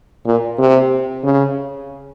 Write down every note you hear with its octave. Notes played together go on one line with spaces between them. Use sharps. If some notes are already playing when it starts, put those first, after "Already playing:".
A#2
C3
C#3